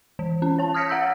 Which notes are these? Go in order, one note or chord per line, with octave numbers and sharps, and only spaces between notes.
E3
C#4
C#5 A5
D#6 F6 G#6 A#6 B6 C#7
C#5 F#5 A#5 E6 G6